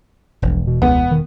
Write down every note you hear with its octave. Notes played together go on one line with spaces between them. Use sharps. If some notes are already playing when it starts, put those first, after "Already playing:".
E1 A#1
B2
C#2 B3
D#3